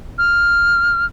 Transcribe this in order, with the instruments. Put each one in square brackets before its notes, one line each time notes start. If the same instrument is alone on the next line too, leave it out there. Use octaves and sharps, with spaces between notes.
[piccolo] F6